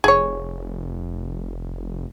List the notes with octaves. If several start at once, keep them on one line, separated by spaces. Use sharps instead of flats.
F1 G#4 C#5